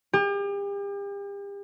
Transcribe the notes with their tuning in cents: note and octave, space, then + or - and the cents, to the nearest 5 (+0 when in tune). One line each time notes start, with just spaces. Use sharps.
G4 +40